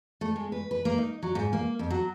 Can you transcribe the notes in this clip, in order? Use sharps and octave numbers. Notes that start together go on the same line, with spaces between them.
A3
G#3
B4
B4
A#3
D#4
F#3
G#2
A#3
F2
F#3